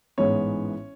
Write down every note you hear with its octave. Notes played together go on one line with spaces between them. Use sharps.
A1 G#2 E3 G#3 B3 C#4 C#5